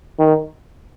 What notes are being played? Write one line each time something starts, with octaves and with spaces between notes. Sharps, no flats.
D#3